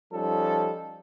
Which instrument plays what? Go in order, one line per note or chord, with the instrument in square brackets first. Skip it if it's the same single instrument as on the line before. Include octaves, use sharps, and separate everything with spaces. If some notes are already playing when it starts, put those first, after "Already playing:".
[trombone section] F3 G3 C#4 D#4 A4